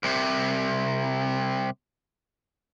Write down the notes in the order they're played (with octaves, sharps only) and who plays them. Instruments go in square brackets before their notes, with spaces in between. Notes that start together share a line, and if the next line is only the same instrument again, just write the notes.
[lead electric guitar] C2 C3